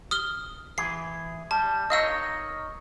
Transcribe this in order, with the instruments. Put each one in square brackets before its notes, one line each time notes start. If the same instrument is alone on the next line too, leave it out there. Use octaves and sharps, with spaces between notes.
[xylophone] D#6 F6 G7
[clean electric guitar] E3 G#4 [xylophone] C7
[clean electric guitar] G3 [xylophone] A5
[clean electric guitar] D#4 A#4 C#5 [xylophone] D#5 F5 E6